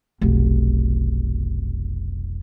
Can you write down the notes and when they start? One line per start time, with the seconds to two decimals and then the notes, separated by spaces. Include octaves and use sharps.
0.21 F1 B1